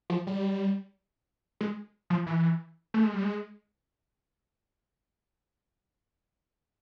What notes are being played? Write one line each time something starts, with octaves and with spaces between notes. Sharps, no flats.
F3
G3
G#3
F3
E3
A3
G#3
G3
G#3